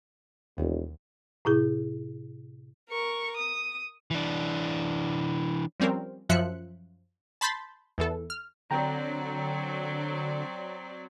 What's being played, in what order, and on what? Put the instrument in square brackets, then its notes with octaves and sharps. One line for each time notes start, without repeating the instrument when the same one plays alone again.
[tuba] E1 [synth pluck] D#2
[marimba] A2 C3 E4 G#4
[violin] A#4 C#6
D#6
[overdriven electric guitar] E3 D4
[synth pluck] F3 G3 C4 C#4 A#4
F#2 F3 C5 E5 F#6 C#7
A5 B5 C6 G6 A6 B6
E2 E3 A4
F6
[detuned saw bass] D3 [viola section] F#3 C4 D5 [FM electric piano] G5 A#5